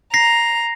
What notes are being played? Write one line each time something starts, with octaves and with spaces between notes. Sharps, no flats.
A#5 A#6 C7